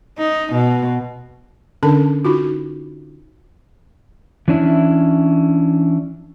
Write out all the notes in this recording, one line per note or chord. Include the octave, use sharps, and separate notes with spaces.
D#4
B2
D3 C#4 D4 A4 A5
D#4 F4 F#4
E3 C#4 D4 E4